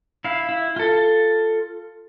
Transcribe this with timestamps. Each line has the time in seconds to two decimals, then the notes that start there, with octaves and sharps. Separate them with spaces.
0.24 E4 F5
0.49 E4
0.76 F4 A4